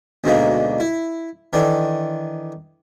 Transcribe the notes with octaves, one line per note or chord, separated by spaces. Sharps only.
D2 G#2 B2 D3 G#3 A#3
E4
D#3 E3 D4 A4